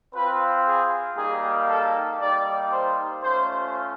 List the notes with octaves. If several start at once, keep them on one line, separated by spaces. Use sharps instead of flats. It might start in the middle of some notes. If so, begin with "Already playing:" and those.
C4 F4 B4
G#4
G3 A#3 D#4 G4 G#4
A4
G3 A#3 D#4 G4 D5
C5
A3 C#4 F4 C5